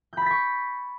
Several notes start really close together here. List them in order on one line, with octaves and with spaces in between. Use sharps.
G6 B5 A6 B6 C#6